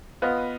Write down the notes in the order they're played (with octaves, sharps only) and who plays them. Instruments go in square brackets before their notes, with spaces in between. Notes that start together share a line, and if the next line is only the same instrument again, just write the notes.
[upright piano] B3 F4 B4 D#5